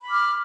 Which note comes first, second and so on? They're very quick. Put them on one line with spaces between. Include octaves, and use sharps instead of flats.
B5 D6 F6